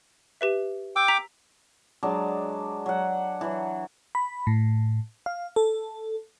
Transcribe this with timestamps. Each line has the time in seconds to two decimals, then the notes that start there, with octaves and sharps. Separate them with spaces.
0.41 G4 B4 E5
0.96 G5 D6 E6
1.08 A#5 B6
2.03 F#3 G#3 D4 D5
2.86 F#3 F#5
3.41 E3 F#3
4.15 B5
4.47 A2
5.26 F5
5.56 A4